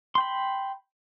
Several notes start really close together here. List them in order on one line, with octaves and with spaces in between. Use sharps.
C6 G5 B5